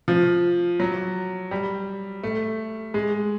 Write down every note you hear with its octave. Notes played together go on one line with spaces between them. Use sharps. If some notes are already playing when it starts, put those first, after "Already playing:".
F3
F#3
G3
A3
G#3